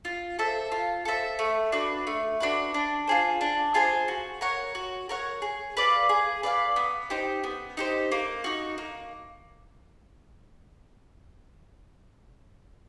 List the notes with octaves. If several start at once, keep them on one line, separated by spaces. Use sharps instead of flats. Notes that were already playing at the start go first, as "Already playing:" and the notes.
F4
A4 C5 E5
F4
A4 C5 E5
A3
D4 F#4 B4
A3
D4 F#4 B4
D4
F4 G#4 C5
D4
F4 G#4 C5
F#4
A#4 C#5 F#5
F#4
A#4 C#5 F#5
G#4
B4 D5 F5
G#4
B4 D5 F5
B3
D#4 G4 C5
B3
D#4 G4 C5
A#3
D#4 F#4
A#3